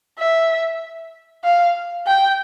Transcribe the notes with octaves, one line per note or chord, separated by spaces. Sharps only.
E5
F5
G5